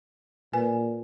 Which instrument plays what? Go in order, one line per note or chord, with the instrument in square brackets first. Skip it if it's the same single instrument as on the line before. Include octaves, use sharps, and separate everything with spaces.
[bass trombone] A#2 [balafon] B4 G#5